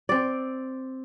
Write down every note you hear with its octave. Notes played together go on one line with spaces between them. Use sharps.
C4 D5